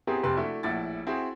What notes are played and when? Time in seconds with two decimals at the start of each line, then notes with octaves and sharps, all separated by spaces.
0.07 B3 C4 E4 G4 G#4 A#4
0.23 F1 C3 C4 B4 C6
0.37 A3 D4 E4 F#4
0.63 A#1 A2 E4 F#5 A6
1.07 C4 E4 F#4 G#4